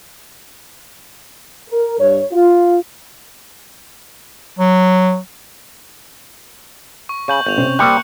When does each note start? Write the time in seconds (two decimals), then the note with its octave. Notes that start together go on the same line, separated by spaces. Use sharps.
1.70 A#4
2.00 G2 C#5
2.32 F4
4.59 F#3
7.09 C#6
7.28 C#3 C#6 G6 F#7
7.46 G1 G6 F7
7.58 C3 C4 C#4
7.79 G3 A#3 C4 D#6 F#6 G6 C#7